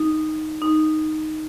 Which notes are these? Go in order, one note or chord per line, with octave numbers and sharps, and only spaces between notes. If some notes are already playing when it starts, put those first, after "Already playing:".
Already playing: D#4
D#4